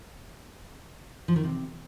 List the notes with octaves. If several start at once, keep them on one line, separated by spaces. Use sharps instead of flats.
F3
D#3
C3